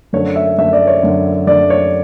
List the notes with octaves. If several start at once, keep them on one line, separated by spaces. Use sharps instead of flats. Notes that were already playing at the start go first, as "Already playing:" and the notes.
F#2 D3 A3 C#5
E5
F#2 D3 A3 E5
D5
C#5
F#2 D3 A3
F#2 D3 A3 D5
C#5